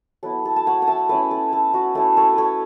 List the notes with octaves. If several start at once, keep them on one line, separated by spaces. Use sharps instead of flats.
F#3 B3 E4 A4
A4
A5
C#5 F#5
F#5
E5 A5
A3 C#4 E4 B4 E5
A4
A4
F#4
A3 C#4 E4 A4
A4 C#5
A4 B4 C#5